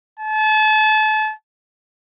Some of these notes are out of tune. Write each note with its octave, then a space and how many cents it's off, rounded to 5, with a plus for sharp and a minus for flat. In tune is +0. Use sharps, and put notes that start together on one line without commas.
A5 -35